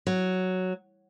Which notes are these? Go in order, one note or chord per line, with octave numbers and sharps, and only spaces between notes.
F#3